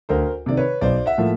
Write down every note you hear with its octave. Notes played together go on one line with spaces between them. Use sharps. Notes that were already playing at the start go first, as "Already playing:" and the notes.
D2 A#4 C5
C3 D#3 D5
B4 C#5
B1 C5 D5
E5 F#5
A2 F3 A#3